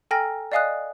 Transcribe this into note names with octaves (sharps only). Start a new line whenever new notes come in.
A4 G5 G#5 A#5 F6 A#6
D5 D#5 F5 G#5 D#6 F#6